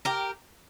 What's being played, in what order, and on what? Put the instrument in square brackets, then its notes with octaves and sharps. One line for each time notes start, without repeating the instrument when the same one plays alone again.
[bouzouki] G4 A#4